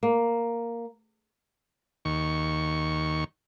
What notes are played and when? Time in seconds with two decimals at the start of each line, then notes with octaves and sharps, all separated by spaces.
0.03 A#3
2.05 D#2 C#6